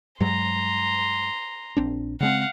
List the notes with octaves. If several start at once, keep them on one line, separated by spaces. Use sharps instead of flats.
G2 F#3 G#3 A#5 C6
A#1 C4 D4
C#3 G#3 C4 F5 F#5